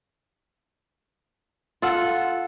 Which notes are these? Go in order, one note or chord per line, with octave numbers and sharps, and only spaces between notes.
F4 A4 F#5